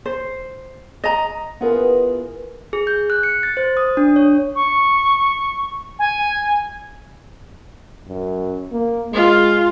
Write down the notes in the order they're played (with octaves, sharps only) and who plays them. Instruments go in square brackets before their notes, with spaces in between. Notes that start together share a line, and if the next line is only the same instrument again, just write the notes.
[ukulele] C5
D#5 A#5
[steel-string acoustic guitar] B3 E4 F4 G#4 A#4 B4
[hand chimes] G#4
G6
F#6
C#7
A6
C5
D#6
D4
C#5
[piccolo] C#6
G#5
[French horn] F#2
A#3
[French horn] G#3 [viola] F4